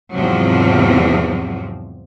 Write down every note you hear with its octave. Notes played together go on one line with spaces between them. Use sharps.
E2 G#2 C3 F3 F#3 C4